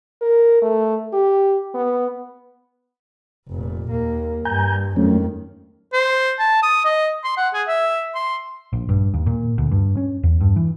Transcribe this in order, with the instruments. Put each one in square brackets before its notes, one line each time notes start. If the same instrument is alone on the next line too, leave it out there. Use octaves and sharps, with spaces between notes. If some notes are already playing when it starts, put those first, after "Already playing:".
[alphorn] A#4
A3
G4
B3
[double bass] F1 A#2
D#2 A#3
[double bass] G2 [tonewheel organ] G#5 A#5 G6
[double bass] F2 D#3 [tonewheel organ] F#3 A3 C#4
[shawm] C5
A5
D#6
D#5
C6
F#5
G#4
E5
C6
[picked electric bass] A#1
G2
D#2
A#2
D2
G2
C#4
E2
G2
E3